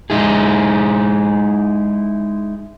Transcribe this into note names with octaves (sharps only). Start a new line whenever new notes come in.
G#3 D#4 E4 G#4